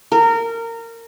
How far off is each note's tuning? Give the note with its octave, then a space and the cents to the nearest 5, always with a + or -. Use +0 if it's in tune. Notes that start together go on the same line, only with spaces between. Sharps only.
A#4 -20